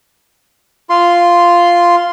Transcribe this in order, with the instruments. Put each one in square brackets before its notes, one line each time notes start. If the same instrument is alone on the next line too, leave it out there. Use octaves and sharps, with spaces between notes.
[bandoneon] F4 C6